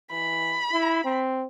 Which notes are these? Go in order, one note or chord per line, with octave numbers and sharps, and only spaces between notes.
E3 B5
E4
C4